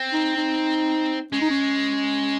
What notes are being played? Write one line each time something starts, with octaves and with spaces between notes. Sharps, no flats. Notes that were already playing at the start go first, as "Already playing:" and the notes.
Already playing: C4
D#4
D#4
G#3 C#4
D#4
C#4